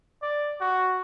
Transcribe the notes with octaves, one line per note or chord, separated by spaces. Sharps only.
D5
F#4